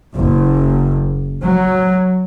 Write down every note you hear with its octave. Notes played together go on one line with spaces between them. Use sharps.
F#1
F#3